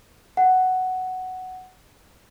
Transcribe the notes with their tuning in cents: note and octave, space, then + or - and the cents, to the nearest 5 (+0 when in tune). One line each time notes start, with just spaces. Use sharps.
F#5 +5